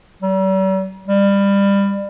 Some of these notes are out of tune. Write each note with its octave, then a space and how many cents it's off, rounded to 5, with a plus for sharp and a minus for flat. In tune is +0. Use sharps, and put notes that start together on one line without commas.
G3 -45
G3 +25